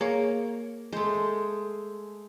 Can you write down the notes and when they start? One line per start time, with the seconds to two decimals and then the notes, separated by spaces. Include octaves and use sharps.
0.01 A#3 G#4 C#5
0.93 G#3 A3 C5